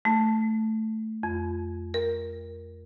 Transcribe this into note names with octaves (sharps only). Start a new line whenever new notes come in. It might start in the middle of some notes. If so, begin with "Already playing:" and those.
A3
F2
A#4